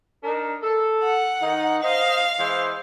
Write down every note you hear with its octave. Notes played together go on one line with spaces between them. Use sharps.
D4 D#4 A#4
A4
F#5
D#3 D#4
C5 D#5 F5
E3 G#3 C5